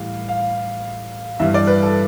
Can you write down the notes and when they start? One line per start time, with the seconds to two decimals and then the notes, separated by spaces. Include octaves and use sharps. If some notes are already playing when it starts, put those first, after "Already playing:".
Already playing: A2 E3 G3 F5
0.28 F5
1.39 G2 E3 G3 E5
1.54 D5
1.67 B4
1.82 A4